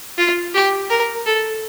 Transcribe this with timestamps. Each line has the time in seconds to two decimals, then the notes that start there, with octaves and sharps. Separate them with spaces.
0.18 F4
0.54 G4
0.90 A#4
1.26 A4